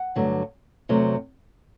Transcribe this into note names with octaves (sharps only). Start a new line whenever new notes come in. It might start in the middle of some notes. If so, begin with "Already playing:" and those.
Already playing: F#5
G2 D3 F#3 A3
E2 C3 F#3 A3